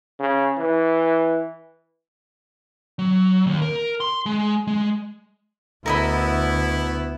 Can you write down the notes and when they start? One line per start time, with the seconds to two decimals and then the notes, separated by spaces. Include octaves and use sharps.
0.20 C#3
0.58 E3
2.99 F#3
3.47 D#2
3.62 A#4
4.00 C6
4.26 G#3
4.67 G#3
5.86 D2 B3 E4 A#4 D#5 B5